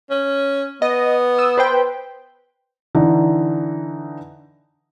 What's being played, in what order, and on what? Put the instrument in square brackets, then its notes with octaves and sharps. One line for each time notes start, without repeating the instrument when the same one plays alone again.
[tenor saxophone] C#4
[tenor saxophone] B3 [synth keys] D#5
[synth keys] D#6 E6
B4 C5 G5
[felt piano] D3 E3 D#4